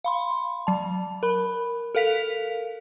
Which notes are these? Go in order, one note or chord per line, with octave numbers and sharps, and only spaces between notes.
F5 B5 C6
F#3 A5
A#4 B5
A4 A#4 F5 B6 F7